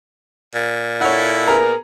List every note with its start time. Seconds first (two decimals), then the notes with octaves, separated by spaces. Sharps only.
0.55 A#2
1.01 E4 A4 C#5 F#5
1.48 B3 G#4 A#4 A#5